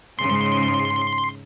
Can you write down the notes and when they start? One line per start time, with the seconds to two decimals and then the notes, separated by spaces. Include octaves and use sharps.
0.19 G#2 C#3 C6